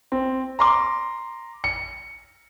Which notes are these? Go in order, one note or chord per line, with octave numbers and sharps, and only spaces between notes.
C4
A#5 C6 D6
C#7